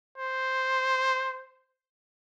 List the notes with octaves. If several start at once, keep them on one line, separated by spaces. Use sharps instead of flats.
C5